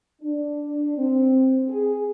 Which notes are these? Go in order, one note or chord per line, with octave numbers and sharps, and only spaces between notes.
D4
C4
G#4